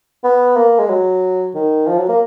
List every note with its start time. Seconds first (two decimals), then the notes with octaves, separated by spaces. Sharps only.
0.24 B3
0.56 A#3
0.79 G#3
0.89 F#3
1.55 D#3
1.87 F3
1.98 F#3
2.09 A#3